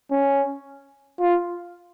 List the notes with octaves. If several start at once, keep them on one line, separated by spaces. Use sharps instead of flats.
C#4
F4